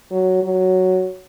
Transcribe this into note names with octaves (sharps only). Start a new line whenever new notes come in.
F#3
F#3